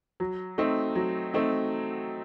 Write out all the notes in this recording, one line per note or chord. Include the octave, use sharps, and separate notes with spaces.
F#3
A3 C4 D#4
F#3
A3 C4 D#4